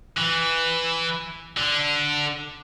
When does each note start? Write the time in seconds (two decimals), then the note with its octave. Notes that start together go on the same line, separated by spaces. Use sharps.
0.17 E3
1.57 D3